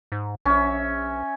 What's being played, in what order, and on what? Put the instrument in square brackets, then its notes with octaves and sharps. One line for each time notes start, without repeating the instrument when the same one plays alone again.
[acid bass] G#2
[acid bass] A#1 [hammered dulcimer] C#4 E5